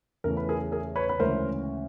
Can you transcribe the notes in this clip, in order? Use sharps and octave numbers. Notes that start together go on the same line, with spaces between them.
E2 C#3 E3 A3 A#4
B4
G#4 A#4
G#4 A#4
B4 C#5
B4
D2 C#3 E3 G#3 C#4 A#4 C5